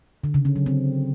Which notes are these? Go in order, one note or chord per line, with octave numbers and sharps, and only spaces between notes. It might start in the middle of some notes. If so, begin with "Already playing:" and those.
D3
C#3
C#4
F#3
C4